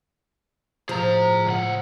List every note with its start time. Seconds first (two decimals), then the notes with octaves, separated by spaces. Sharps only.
0.89 A2 F3 G#4 A#5
1.47 C#2 F#5